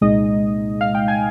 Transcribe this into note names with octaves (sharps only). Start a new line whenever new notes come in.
C2 A#2 G#3 D#4 D#5
F5
G5
G#5